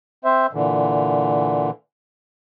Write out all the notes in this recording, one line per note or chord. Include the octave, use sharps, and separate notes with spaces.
C4 C5 E5
A#2 D3 E3